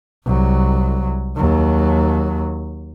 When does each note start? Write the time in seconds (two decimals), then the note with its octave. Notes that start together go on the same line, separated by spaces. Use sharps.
0.25 C2 F#3
1.37 D#2 F#3